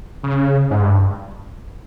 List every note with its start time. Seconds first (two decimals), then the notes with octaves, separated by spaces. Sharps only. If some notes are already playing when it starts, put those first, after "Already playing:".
0.24 C#3
0.71 G#2
0.82 G2